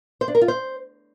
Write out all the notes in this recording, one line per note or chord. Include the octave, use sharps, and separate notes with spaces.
C5
D4
A#4
F4
C5